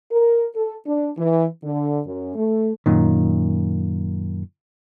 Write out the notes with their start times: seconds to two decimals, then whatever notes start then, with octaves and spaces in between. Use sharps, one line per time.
0.11 A#4
0.55 A4
0.85 D4
1.18 E3
1.63 D3
2.06 F#2
2.35 A3
2.86 F#2 A#2 D#3